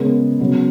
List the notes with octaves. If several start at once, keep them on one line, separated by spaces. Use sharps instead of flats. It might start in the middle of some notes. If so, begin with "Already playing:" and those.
Already playing: C#3 G#3 B3 A#4
C#3 F#3 B3